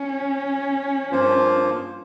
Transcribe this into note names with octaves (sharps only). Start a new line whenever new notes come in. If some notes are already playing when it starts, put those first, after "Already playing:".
Already playing: C#4
G2 F3 A#3 F4 C5